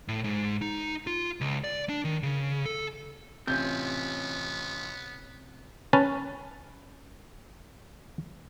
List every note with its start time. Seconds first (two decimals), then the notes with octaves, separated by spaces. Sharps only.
0.08 A2
0.24 G#2
0.62 D#4
1.07 F4
1.41 C#2
1.64 D5
1.89 D4
2.05 D#3
2.23 C#3
2.66 A4
3.47 A1 C3 B3 C#4 F4 G6
5.93 C#4 B4 A5